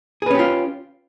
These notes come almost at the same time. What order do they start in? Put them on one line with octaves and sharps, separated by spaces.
G#4 B4 C#4 G4 F4